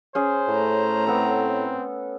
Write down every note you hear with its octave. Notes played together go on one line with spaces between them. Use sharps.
C#4 G#4 C5
A2 A3 A#5
B3 C4 A4